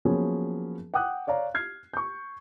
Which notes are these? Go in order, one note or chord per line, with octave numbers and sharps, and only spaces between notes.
F3 F#3 A#3 B3 C#4 G#4
F#5 G5 D6 D#6 F#6
C#5 D5 F5 A#5
F6 G#6 C7
C#6 G6